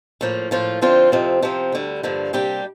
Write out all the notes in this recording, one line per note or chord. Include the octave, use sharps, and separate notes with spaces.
A2 F3 A#3
A2 F3 A#3 F4
F2 D3 F3 C4 F4
F2 C3 F3 C4
C3 F3 C4
D2 D3 G3
G2 D3 F3 A#3 D4
C3 G3 A#3 D4 G4